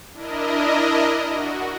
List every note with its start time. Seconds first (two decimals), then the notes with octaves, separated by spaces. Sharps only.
0.13 D4 E4 A#4 D#5
1.28 F#4